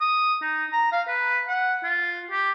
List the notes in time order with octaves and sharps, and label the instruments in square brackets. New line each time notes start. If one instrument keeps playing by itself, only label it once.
[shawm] D#6
D#4
A#5
F5
B4
F#5
F4
G4